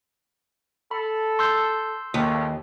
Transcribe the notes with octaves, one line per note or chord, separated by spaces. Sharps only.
A4 B5
C6 E6 G6
D#2 C#3 F3 A3